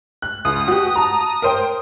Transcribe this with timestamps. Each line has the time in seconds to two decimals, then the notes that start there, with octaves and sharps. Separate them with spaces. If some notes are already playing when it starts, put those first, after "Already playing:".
0.22 F#6
0.45 C#2 D#6
0.68 F#4 G4
0.96 A5 A#5
1.42 A#4 C5 G5